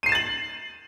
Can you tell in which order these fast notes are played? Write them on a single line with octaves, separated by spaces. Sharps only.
D#7 C7 E7 A6 F#7